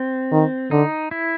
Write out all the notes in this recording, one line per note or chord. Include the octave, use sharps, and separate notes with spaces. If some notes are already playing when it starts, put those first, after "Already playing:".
Already playing: C4
D#3
D3 D#4
E4